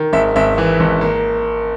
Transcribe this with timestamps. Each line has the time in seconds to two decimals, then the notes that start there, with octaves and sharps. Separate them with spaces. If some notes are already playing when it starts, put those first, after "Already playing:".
Already playing: D#3
0.13 G#1 E5
0.36 G#1 E5
0.58 E3
0.80 G#1
1.01 A#3